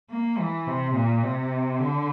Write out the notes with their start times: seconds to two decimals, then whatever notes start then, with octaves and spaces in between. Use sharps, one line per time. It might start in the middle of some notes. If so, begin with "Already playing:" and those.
0.10 A#3
0.38 E3
0.67 C3
0.95 A#2
1.23 C3
1.79 D3